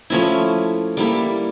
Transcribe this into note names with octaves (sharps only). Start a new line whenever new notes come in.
F3 A3 C#4 E4
G3 A#3 E4 A4